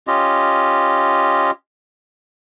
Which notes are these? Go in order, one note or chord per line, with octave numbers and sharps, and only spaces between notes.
C#4 F4 G4 D#5